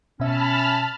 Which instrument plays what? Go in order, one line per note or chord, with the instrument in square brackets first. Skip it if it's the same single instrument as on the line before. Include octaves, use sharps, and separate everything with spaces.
[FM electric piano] B2 E5 [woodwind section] C#4 [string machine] A5 B5 F6